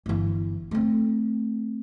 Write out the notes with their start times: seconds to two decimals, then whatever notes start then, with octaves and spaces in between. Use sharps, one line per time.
0.06 G1 E3
0.71 A3 C4